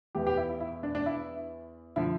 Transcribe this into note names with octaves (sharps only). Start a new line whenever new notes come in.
E2 E3 G4
G4
E4
E4
E4
D4
D4
E4
D3 F3 E4